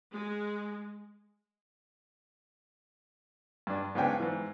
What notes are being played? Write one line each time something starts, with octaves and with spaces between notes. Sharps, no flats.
G#3
G2 D4
G#2 C#3 B3 D4 G5 G#5
G#2 E3